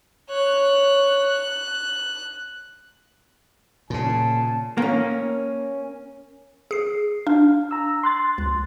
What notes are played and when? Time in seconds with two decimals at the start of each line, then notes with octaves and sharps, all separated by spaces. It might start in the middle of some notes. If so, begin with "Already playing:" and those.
0.29 C#5 F#6
1.26 F#6
3.90 A#2 C#3 A5
4.78 A#3 C#4
6.71 G#4 C7
7.27 D4 F5
7.71 A#5 E6
8.03 C6 F#6 A6
8.38 C#2